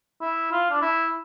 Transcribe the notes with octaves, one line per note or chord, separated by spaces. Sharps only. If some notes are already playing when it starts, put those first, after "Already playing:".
E4
F4
D4
E4